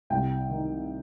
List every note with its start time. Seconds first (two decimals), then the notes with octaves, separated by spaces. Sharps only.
0.10 C2 G5
0.49 D#3